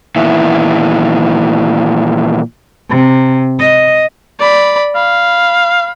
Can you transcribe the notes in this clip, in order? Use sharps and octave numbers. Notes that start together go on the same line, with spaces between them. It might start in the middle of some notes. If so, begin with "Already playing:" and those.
A#2 D#3 E3 B3 E4
C3
D#5
D5 B5
F5 B5